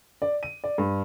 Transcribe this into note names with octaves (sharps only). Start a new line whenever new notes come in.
D5
D#7
D5
G2